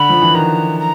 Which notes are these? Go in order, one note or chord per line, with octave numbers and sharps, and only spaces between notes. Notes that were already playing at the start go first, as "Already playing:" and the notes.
Already playing: D3 B5
F3
E3
D#3 A#5
A#5